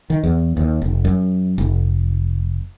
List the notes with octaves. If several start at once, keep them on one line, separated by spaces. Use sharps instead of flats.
D#3
E2
D#2
F1
F#2
F1